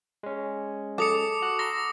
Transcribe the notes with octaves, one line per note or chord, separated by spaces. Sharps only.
G#3 C#4
A4 D6 D#6 C#7
F#4 F#6
A#5 C6 E6 A#6